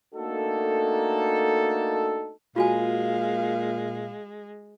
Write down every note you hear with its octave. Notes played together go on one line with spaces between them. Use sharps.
A3 A#3 D4 D#4 F#4 A4
A#2 G#3 F4 F#4 F5 G#5